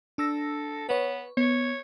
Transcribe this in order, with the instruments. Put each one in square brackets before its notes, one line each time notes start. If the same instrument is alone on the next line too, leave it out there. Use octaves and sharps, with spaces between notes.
[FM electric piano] D4 E6 A#6 [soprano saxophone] A4
[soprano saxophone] B3 [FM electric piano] B4 C#5
[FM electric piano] B3 [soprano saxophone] C#5